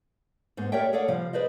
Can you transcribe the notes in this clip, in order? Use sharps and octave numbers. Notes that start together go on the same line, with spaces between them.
G#2 B3 C5
G4 A#4 C#5 D5 E5 G5
G#4 A4 C#5 D5 F5 F#5
C3 F3 G3 F5
G#4 B4 C5 D5 D#5